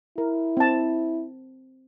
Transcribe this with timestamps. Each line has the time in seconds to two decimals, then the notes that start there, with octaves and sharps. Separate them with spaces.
0.18 E4 A#4
0.57 C4 A5